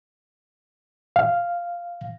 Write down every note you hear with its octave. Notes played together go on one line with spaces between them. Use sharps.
F5